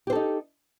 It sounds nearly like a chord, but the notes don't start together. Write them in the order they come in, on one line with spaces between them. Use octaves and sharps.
G4 C5 A4 D#4